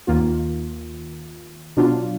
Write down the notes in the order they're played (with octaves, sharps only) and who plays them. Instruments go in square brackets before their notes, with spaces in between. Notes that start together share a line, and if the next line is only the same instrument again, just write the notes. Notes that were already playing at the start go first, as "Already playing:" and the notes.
[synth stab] D#2 D#3 A#3 F4
B2 F#3 D4 F4